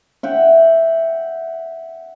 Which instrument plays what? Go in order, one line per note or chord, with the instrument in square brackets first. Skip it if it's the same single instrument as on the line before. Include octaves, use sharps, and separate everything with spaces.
[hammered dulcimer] E5 F#5 G5